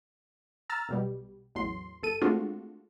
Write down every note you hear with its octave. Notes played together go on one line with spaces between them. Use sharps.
A#5 E6 F6 A6
B1 B2 G3
A1 E2 F#3 C6
G1 A4 D#7
G#3 A3 C4 D4 F4 F#4